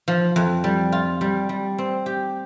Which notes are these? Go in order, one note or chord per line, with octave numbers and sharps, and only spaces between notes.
F3
F2
G3
F4
G3
G3
C4
G4